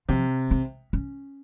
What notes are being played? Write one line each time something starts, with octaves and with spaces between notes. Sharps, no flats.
C3 F3
C4
C#4